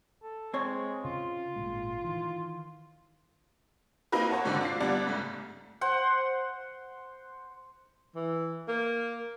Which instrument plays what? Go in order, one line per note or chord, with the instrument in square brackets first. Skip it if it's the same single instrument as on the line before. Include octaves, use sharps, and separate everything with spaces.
[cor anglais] A4
[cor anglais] G#3 [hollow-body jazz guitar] C4 C#5
[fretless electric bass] C#3 [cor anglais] F4
[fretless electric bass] G#1 A#2 G#3
D#3 E3
[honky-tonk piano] A#3 C4 D#4 E4 A#4 B4
C5 C#5 F#5 A5
G#2 D3 D#3 C4 D4
D4 F4 C7
G1 G3 B3 D4 D5 F#6
G#2 C#3 A3
[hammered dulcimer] C5 F#5
[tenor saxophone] E3
A#3